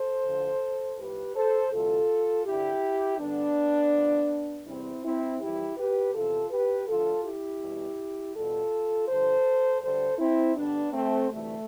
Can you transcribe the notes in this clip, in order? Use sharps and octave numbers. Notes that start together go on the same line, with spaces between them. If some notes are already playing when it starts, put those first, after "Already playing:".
Already playing: A4 C5
D2 D3 F3
A2 F3 G4 B4
A4 C5
D2 C3 E3 G3 F4 A4
G2 D3 G3 E4 G4
G2 D3 G3 B3 D4
G2 F3
E2 C3 G3 C4 E4
C4 E4
F2 E3 G3 E4 G4
G4 B4
E2 C3 F3 F4 A4
G4 B4
D2 D3 F3 F4 A4
E4 G4
E2 B2 G3
E2 B2 G3 F4 A4
G2 D3 F3 A4 C5
D2 D3 G3 A4 C5
C4 E4
G2 D3 G3 B3 D4
A3 C4
D2 C3 E3 G3 A3